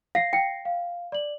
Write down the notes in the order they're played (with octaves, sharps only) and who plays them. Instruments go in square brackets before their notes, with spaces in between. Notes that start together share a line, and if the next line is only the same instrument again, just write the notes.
[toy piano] F5 [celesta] A#6 C7
[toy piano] G5
[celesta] F5
D5 F#7